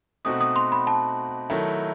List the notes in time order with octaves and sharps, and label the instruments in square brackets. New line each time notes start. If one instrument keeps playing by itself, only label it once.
[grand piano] B2 A3 C4 D#4 F#4 [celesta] D#6
[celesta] D#6
C6
B5
A5
[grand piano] D#3 F#3 A3 E4 A4